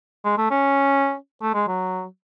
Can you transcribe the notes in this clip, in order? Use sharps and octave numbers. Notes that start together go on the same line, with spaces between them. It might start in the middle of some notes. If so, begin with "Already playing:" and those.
G#3
A3
C#4
A3
G#3
F#3